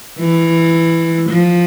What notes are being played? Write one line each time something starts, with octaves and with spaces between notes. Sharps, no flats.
E3
F3